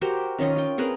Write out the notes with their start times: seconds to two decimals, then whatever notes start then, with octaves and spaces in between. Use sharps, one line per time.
0.01 F#4 G4 A#4 C5
0.39 D#3 C#4 F4 D#5
0.56 F4 G5
0.78 C4 G#4 A#4 B4